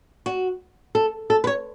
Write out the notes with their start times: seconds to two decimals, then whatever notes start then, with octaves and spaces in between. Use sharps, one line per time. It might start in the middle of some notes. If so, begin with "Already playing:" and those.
0.26 F#4
0.95 A4
1.30 A4
1.44 B4
1.47 C#5